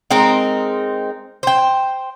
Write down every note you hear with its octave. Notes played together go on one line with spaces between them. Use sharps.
G#3 C4 D#4 A#4
C5 G5